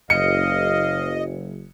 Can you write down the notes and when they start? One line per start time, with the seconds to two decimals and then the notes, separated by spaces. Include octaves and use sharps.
0.10 F#1 D#5 F5 C#7